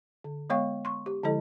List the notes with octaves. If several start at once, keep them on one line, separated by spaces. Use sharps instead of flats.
D3
G#3 B3 C#5 F5 G5 C#6
C6 C#6
G4
D3 F3 G#3 E4 A4 D#5